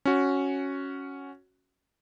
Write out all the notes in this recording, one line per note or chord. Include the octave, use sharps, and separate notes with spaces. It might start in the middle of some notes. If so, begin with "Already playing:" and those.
C#4 F#4